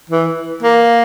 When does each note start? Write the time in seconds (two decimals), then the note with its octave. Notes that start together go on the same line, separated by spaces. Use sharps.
0.10 E3
0.62 A#3